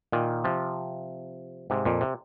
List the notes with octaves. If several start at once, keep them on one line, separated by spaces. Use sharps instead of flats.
A#2 D#3
C3 F3
G#2 C3
F2 A#2
C3